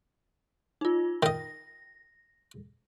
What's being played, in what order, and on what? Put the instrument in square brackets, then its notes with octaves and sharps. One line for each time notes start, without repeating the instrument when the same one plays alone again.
[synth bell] D#4 F4
[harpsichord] D#3 D#5 [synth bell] A#6